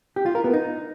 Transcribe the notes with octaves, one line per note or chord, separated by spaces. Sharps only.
G4
F4
A#4
B3
D#4